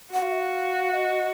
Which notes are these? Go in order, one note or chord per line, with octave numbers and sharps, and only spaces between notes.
F#4 F#5
F5
E5
F5
D#5